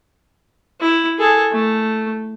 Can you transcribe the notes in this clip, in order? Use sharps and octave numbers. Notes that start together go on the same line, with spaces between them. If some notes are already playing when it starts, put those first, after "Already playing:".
E4
G#4 A4
A3